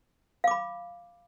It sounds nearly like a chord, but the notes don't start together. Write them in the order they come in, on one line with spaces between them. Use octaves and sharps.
F5 D6 B5